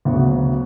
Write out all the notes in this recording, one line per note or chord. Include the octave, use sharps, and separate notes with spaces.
D2 C#3 F#3 B3 F#4